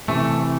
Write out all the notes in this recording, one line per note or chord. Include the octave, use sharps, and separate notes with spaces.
C3 E3 A3